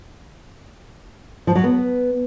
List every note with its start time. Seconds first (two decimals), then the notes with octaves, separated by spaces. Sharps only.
1.47 F3
1.55 F#3
1.64 B3